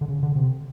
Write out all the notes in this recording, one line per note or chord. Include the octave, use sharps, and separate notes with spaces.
D3
C#3
D3
C3